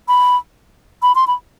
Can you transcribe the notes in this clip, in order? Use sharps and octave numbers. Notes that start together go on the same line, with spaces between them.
B5
B5
C6
B5